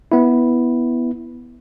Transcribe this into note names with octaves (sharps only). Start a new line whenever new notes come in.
B3 E4